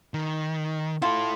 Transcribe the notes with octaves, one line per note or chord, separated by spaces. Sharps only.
D#3
E4 F4 A4